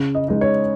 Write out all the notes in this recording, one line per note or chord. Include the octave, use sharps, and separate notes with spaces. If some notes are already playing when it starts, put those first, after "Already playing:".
Already playing: C#3
D#5
G#3 D#4
C#5